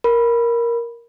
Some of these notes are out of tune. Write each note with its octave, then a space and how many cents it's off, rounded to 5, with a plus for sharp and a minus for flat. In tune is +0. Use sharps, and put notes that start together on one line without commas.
A#4 +5 B5 -5